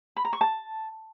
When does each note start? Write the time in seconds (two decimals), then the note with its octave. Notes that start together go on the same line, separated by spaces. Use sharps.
0.16 B5
0.25 A#5
0.33 C#6
0.41 A5